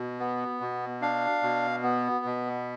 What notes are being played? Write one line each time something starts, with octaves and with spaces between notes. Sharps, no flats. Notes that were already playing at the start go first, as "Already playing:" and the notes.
Already playing: B2
B3
B2
D4 F5
B2
B3
B2